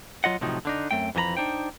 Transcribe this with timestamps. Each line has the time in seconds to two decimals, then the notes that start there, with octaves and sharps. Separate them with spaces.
0.24 F#3 F4 D#5 F#5
0.41 A2 C3 F3 F#3 D#4
0.65 D3 D4 D#4
0.91 F#2 A3 C4 G5
1.15 F2 E3 F3 F#4 A#5 B5
1.37 D4 D#4 C5 G5